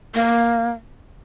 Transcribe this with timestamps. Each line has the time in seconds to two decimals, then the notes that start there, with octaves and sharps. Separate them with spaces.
0.15 A#3